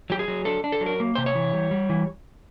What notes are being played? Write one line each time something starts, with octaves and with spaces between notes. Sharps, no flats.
F#3 G4
G#4
F#3
D4 A4
D4
A4
F#3
A#4
A#3
C3 C5
C#5
E3
G3
G3
E3